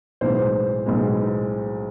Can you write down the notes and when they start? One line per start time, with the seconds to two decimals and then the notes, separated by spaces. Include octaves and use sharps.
0.21 B1 A2 E3 G#3 C5
0.86 B1 A2 E3 G#3